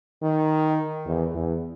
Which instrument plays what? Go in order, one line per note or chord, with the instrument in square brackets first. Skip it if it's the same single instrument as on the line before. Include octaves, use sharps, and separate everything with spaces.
[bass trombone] D#3
E2
E2